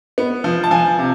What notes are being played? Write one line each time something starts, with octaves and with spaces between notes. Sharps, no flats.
B3
F3
A5
F3 G#5
C3